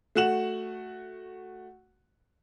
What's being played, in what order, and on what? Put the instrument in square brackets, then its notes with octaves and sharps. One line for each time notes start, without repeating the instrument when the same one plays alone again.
[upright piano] A3 F#4 F#5 E7 F#7